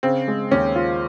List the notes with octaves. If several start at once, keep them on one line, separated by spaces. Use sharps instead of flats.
C#3 C4
G#3
D#2 C#4
F4